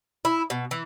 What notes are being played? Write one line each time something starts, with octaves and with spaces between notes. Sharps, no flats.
E4
B2
E3